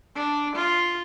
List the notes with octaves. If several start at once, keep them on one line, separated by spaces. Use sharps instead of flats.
D4
F4